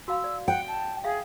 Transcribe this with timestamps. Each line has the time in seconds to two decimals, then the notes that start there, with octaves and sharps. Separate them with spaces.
0.08 F#4 F5 B5 E6
0.24 D5
0.48 F#5 G5
0.68 A5
1.04 G#4 E5 F5